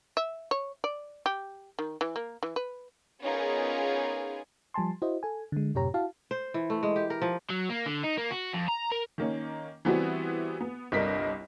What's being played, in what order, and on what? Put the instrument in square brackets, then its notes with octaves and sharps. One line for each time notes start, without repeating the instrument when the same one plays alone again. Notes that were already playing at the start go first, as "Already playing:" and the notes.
[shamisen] E5
C#5
D5
G4
D#3
E3
A#3
E3
B4
[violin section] B3 C#4 D#4 F4 G#4 A#4
[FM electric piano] F3 G3 G#5 A5 C6
E4 F#4 C5 D#5
A4 G#5
D3 G#3
F#2 A2 C3 G4 C#5 A#5
E4 F#4 F5 A5
[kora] C5
E3
A3
G#3
G4
A#4
F3
[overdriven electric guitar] F#3
A#3
D3
D#4
A#3
F#4
F2
A#5
A#4
[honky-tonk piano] D#3 A#3 C#4
E3 G3 B3 C4 E4 F#4
B3
G1 C2 D4 A#4 D#5 B6